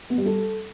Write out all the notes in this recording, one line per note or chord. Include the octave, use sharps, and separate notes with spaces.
B3
G3
A4